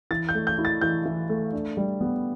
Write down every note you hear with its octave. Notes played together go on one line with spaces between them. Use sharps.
E3 A6
G6
A3
G6
E4
A6
E3 G6
E3
A3
D4
G3
B3